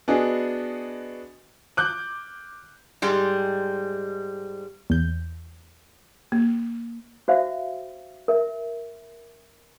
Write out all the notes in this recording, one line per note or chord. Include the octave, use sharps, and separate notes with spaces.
B3 D4 F#4 G#4 D#5
D6 F#6 G6
G#2 G3 G#3
E2 G6
A#3
F#4 C5 E5 F5
A#4 E5